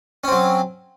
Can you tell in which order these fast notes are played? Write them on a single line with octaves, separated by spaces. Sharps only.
C#4 C4 F#3